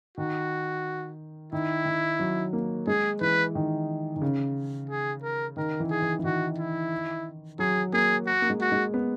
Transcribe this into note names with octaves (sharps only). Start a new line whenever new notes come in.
D#3 F#4
D#3 E4
D#3
F#3
A#3
G#3 G#4
E3 B4
D#3
D#3
C#3
G#4
A#4
D#3 A#4
E3
G#4
E3
E3
D#3 F#4
E4
F#3 G#4
A#3 G#4
F#4
A#3
G#3
F#4
G#3
B3